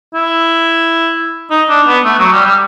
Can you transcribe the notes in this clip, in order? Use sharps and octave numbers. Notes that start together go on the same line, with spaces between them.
E4
D#4
D4
B3
A3
F#3
G3
G3